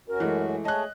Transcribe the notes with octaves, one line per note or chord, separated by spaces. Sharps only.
F#2 C#4 F#4 A#4
E3 G#3 A3
A3 G#4 C#5 D#5 A5 F#6